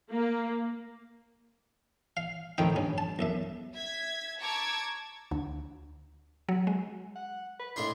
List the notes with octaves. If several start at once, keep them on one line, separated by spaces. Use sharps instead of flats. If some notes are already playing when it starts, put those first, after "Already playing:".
A#3
F5
F2 A2 D#3 D#4 G5
G2 C#4
A5
B1 F#2 E5
E5 G#6 B6
A5 A#5 C#6 D6 E6 G#6
D2
F#3
G#3
F#5
B4
A2 G#3 D4 C6